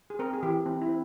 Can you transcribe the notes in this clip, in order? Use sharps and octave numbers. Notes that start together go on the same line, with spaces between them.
G#4
C4 A#4
G#4
E3 G4
C4 E4
E4
C4